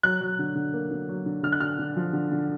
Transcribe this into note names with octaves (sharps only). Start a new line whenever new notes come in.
F#3 F#6
F#3
D3
D3
A#3
D3
F#3
D3
D3 F6
F#6
D3 F6
D3
F3
D3
D3